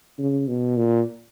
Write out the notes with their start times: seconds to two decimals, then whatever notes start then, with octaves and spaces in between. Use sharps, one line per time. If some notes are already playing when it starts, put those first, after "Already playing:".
0.18 C#3
0.48 B2
0.77 A#2